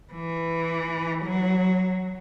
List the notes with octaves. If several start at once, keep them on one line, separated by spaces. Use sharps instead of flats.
E3
F#3